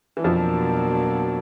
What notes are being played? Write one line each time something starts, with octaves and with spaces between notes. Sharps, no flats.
E3
F2 B2 F3 F#3 A#3 D4